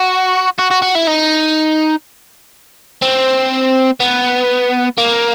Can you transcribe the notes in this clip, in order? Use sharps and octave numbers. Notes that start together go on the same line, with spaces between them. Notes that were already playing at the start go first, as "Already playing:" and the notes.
Already playing: F#4
F#4
F#4
F#4
E4
D#4
C4
B3
A#3